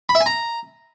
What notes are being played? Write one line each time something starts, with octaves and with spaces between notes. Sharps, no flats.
B5
E5
G#5
A#5